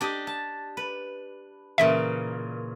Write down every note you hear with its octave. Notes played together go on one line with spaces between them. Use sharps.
D4 G4 D#5
A5
B4
A#2 C#3 E3 E5